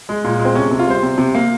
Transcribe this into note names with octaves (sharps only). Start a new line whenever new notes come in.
G#3
A#2
G#3
C4
C3 C#4
C3
F4
G3 C5
C3
C3
A#3